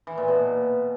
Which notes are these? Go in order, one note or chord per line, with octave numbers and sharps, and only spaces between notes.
E3
A#2
B2